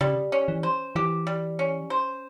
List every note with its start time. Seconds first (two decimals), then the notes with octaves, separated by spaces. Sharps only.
0.01 C#3 G3
0.32 C#4
0.48 E3
0.63 C5
0.95 E3 G4
1.27 G3
1.59 C#4
1.90 C5